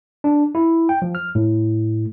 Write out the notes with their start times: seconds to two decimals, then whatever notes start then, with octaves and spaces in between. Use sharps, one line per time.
0.24 D4
0.55 E4
0.89 G5
1.02 F3
1.15 F6
1.35 A2